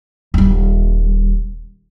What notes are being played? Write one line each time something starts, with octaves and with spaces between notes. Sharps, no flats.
D#1 G3